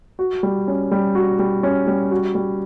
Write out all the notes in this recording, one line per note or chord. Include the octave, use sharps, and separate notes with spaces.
F#4
G3
C#4
G3
F#4
G3
C#4
G3
F#4
G3